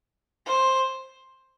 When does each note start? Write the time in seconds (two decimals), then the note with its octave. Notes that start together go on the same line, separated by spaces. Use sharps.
0.46 C5